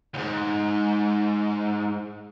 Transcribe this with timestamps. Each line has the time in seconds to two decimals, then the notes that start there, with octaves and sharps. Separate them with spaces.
0.14 D#2 G#2